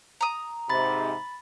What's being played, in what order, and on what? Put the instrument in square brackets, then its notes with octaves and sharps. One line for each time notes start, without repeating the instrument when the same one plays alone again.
[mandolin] A#5 D#6
[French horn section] G#2 C3 [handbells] B5 A6